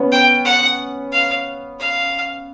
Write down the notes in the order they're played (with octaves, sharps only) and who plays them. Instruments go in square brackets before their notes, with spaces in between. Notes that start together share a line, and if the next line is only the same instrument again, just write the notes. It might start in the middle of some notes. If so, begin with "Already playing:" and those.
Already playing: [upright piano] B3 C#4
[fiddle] G5
F#5
F5
F5